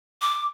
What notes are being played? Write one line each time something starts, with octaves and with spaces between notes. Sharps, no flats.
D6